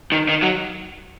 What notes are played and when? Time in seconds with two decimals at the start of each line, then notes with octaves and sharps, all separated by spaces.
0.12 D#3
0.29 D#3
0.42 F#3